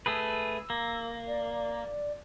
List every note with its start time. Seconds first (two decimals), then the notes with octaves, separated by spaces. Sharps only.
0.06 A3 G#4 B4 E6
0.70 A#3
1.27 D5